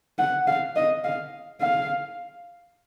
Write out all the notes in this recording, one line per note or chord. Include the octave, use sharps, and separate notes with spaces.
F#5
F5
D#5
F5
F5